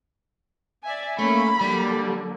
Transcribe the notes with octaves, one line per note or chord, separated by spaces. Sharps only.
D5 E5 G#5
A3 A#3 C#4 B5
D3 F#3 G3 A#3